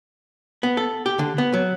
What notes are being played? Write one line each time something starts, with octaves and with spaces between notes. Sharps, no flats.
B3
A4
G4
D3
B3
F#3